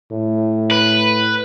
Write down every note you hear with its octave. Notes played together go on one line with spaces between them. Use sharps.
A2
B4